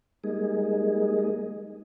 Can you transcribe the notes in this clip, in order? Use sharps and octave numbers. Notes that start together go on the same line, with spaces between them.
G3 G#3 A#3 D#4 G#4